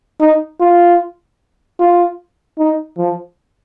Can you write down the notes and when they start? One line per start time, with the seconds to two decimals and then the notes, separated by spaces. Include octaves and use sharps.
0.20 D#4
0.60 F4
1.80 F4
2.59 D#4
2.98 F3